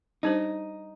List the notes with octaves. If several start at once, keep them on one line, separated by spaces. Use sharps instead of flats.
G3 D4 D#4 G4 C5